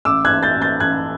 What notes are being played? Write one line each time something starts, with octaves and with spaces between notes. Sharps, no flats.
A1 D6 E6
F#6 G#6
A1
G6 A6
A1
G6 A6
A1 F#6 G#6